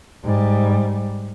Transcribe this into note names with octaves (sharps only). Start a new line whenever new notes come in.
G#2 G3